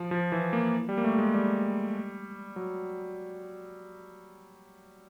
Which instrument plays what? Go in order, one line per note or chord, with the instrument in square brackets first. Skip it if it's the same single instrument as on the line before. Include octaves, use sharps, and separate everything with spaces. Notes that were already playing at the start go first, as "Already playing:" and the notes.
Already playing: [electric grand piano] F3
F3
E3
A#3
G3
A#3
A3
G#3
G3
F#3